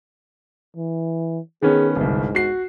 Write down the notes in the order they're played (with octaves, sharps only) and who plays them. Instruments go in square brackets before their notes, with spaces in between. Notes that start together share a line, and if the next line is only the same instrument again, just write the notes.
[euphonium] E3
[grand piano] D#3 B3 C#4 [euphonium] G#4
[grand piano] G1 C2 [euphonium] G#2
[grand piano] F#4 C7